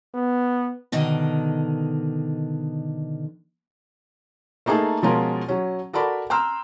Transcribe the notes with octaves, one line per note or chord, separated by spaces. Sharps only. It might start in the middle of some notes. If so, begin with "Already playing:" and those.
B3
B2 D3 D#3 D#5
A3 A#3 D#4 G#4 A4
B2 F3 G#3 C#4 F4 A#4
F#3 C#4
F#4 A4 A#4 D5 B5
G5 A#5 C6 E6 F6